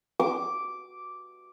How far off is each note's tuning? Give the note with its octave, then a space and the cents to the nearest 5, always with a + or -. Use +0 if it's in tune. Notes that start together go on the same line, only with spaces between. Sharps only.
D6 -5